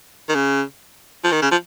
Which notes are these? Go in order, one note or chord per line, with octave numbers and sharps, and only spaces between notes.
D#3
C#3
F3
D#3
C#3
F3